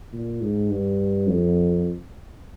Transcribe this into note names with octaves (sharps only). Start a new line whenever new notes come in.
A#2
G#2
G2
F2